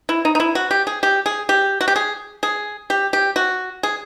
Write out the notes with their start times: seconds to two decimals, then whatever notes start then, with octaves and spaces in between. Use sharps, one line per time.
0.09 E4
0.25 D#4
0.35 D#4
0.40 E4
0.55 F#4
0.71 G4
0.87 G#4
1.03 G4
1.26 G#4
1.49 G4
1.81 F#4
1.88 G4
1.96 G#4
2.43 G#4
2.90 G4
3.13 G4
3.36 F#4
3.83 G#4